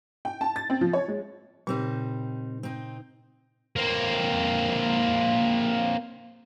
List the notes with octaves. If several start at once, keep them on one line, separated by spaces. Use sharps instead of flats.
G5
A5
A6
C4
F3
C#5
G#3
A#2 C#3 G3 C4 D#4
C4 D#4
A#3 C4